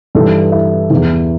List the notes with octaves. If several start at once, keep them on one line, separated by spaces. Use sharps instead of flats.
G2 E3 A4
E4
E2 E3